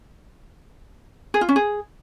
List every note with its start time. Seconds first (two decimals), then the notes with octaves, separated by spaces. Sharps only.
1.34 G#4
1.41 F4
1.49 C#4
1.56 G#4